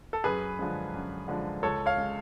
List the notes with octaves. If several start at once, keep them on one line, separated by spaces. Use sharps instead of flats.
A4
F#2 G#4 B4
D3 F3 G#3
F#2
D3 F3 G#3
C#2 A4 C#5
C#5 F5
C#3 G#3